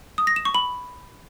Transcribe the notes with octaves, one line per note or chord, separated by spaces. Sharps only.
D#6
A#6
E7
C#6
B5